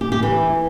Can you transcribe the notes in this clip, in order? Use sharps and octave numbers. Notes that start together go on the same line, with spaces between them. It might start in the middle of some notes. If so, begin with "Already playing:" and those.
G4
G4
E3